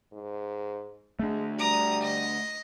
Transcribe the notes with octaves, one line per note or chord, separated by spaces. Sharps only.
G#2
G#3 A3 D4
G3 A#5 D#6
D#5